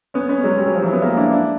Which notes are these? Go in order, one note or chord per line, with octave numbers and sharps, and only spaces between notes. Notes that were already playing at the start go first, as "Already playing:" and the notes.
B3 C#4
B3 C#4
F#3 G#3
G3
F#3
F3
E3 F#3
B3
G#3 A#3
D4 E4
D4 E4